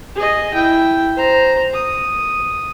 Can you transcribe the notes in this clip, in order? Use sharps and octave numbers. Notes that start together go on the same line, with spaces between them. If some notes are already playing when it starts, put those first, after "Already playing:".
G#4 D#5
E4 G5
C5 A#5
D#6